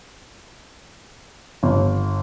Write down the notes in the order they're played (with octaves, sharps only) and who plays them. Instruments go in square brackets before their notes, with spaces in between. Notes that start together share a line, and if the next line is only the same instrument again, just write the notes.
[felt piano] G1